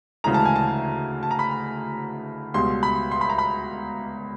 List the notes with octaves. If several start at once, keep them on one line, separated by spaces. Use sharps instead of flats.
D2 C#3 E3 G#3 A#5
A5
G#5
A5
A5
A#5
B5
C#2 B2 G3 C6
B5
C6
B5
A#5
B5